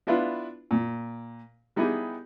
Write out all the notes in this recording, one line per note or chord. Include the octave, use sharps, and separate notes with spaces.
B3 D4 E4 F4 B4 F5
A#2
G3 B3 D#4 E4 G4 G#4